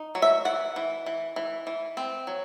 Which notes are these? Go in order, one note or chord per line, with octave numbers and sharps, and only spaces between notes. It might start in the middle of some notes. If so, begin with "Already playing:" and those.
Already playing: D#4
F#3
E5
E3 F#5
E3
E3
E3
E3
C4
F#3